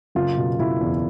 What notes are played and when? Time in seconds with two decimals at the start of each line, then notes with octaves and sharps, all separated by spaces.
0.15 F#1 F4
0.37 B2
0.59 B2 E4
0.81 E2